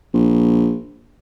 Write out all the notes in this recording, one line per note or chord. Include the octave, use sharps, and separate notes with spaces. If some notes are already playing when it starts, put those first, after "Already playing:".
A#1